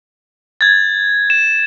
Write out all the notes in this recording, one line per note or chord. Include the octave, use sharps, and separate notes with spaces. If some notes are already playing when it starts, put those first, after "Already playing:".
G#6 A6
E7